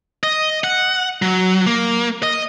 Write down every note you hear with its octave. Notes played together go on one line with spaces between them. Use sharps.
D#5
F#5
F#3
A#3
D#5